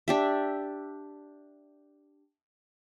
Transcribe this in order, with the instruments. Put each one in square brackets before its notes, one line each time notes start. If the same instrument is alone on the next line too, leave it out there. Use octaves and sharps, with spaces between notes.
[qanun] D4 G4 E5